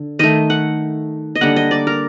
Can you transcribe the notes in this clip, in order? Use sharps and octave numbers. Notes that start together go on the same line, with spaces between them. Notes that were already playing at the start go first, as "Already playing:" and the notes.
Already playing: D3
D#3 A3 D#5
F#5
D#5
D3 G3 A#3 F#5
D#5
D5
A#4